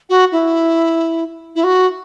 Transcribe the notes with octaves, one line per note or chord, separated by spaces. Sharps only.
F#4
E4
E4
F#4